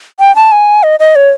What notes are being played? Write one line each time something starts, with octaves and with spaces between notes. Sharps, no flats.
G5
A5
G#5
D#5
D#5
C#5